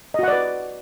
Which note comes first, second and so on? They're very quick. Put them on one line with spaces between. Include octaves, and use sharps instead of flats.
D#5 F#4 F#5 D5 B4